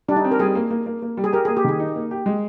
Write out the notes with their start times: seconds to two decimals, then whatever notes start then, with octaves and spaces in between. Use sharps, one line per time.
0.08 G3 D4
0.16 D#4
0.24 C4
0.31 A#4
0.39 G3 G#4
0.55 A#3
0.70 A#3
0.86 A#3
1.02 A#3
1.17 G3
1.24 G#4
1.32 G4 A#4
1.45 A#3 G#4
1.57 G4
1.64 D#3 G#4
1.80 D#4
1.95 A#3
2.11 G4
2.26 G#3